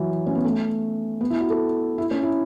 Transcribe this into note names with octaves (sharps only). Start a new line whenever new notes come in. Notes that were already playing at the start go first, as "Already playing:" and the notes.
Already playing: E3 F#3
C#4
B3
A3
B3
E4
F#4
A4
E4
C#4
E4